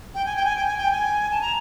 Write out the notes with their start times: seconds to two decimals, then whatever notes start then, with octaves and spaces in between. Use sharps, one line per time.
0.15 G5
0.26 G#5
0.36 G5
0.45 G#5
0.56 G5
0.67 G#5
0.78 G5
0.92 G#5
1.31 A5
1.41 A#5